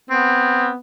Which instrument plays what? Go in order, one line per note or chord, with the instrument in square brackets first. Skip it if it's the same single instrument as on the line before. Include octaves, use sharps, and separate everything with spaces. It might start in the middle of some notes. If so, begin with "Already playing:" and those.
[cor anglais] B3 [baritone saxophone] C4